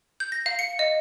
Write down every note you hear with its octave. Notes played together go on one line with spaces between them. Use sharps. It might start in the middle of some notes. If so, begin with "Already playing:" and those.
G6
A#6
F5
C#7
D#5